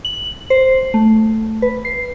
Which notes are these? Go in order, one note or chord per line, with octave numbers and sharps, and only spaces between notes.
F#7
C5
A3
B4
C7